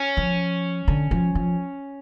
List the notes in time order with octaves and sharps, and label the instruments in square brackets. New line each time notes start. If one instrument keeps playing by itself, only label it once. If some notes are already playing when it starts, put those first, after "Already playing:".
Already playing: [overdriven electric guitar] C#4
[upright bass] F3
D3
F3
F3